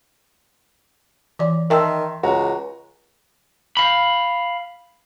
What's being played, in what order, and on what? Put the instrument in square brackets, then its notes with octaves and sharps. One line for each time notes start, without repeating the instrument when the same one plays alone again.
[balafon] E3 D5
[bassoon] D#3 [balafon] A#4 G5 A5 [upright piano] E5 C6 E6
[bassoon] C#2 [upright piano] F#4 A#5
[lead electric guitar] F5 B5